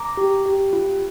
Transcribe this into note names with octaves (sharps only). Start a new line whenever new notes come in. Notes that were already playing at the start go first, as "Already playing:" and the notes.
Already playing: A#5 D6
G4
G4
F4